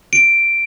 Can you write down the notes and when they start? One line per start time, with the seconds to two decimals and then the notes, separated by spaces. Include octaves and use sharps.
0.13 D7